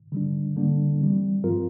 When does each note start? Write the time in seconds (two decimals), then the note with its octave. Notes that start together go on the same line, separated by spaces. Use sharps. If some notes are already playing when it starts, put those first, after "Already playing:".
0.12 D3 G3 D4
0.57 D3 G3 A#3 D4
1.01 E3 G3 C4
1.44 G2 F3 C4 F4 A#4